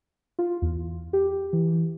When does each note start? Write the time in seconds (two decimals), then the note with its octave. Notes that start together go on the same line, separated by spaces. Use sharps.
0.39 F4
0.62 E2
1.13 G4
1.53 E3